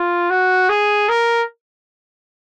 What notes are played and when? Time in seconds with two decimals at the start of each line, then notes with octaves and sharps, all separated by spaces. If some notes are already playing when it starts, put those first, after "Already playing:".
Already playing: F4
0.30 F#4
0.69 G#4
1.09 A#4